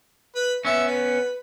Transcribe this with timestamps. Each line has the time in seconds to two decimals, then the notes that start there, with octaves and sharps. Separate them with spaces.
0.35 B4
0.65 B3 C#4 E5
0.87 B4